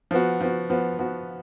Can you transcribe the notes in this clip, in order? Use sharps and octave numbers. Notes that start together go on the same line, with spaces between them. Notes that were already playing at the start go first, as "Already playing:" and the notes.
F3 B3 F#4
F3 B3 F#4
F3 B3 F#4
F3 B3 F#4